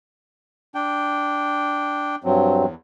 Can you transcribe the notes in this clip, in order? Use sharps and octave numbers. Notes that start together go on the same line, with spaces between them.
D4 G5
G2 F3 F#3 C4
E2